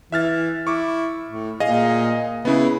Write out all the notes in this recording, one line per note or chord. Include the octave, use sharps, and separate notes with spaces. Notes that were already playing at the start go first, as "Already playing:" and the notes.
E3 E5 F6 A6
E4 C#6 D6
A2
A#2 G#4 D#5 F5
C#3 B3 E4